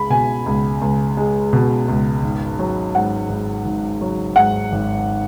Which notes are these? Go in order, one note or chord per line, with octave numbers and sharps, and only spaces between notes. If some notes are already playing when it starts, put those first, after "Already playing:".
Already playing: C#2 G#3 B5
B2 G#5
C#2
C#2
G#3
B2
C#2
G#1
F#3
G#2 F#5
G#1
G#1
F#3
G#2 F#5
G#1